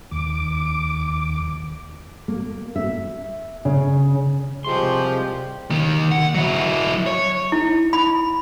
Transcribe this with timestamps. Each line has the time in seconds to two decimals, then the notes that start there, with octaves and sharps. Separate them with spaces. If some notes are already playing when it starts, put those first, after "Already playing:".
0.11 D#2 D6
2.28 A#3
2.76 E5
3.65 C#3
4.64 C2 F3 G#3 G4 C6
5.70 D#2 D#3
6.11 F#5
6.34 F#3 E4
7.06 C#5
7.52 E4
7.93 B5